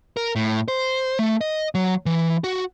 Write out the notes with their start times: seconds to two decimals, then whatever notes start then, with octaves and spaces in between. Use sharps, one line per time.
0.17 A#4
0.36 A2
0.68 C5
1.19 A3
1.41 D#5
1.75 F#3
2.06 E3
2.44 F#4